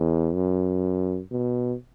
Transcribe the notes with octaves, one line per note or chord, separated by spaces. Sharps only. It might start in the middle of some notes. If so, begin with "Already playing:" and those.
Already playing: E2
F#2
B2